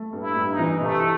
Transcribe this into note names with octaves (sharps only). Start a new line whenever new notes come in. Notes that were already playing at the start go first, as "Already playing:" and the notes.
Already playing: A3
G2
E4
G2
D#4
E3
C3 A3